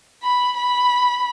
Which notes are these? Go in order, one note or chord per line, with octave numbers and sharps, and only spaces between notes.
B5
B5